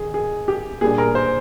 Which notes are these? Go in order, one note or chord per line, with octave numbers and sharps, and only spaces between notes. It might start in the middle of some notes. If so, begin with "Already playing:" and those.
Already playing: D#3 G#4
G#4
G4
A#2 G3 D4 G#4
A#4
C5